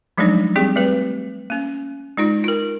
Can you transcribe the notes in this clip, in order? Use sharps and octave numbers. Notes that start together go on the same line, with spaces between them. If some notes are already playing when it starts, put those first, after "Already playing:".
F3 F#3 G#3 A3 D4 D#4
G3 C4 G4 G#4
G3 A3 C4 B4
A#3 C#4
G#3 D#4 F4
F4 A#4